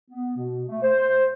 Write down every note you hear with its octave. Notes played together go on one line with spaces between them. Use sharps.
B3
B2
A3
C5